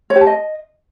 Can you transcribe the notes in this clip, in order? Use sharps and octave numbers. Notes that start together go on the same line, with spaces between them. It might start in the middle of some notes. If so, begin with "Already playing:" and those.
C#5
G4
A5
D#5